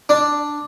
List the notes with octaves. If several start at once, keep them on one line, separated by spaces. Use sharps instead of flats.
D4